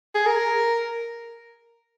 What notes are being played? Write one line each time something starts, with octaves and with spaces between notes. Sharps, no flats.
G#4
A#4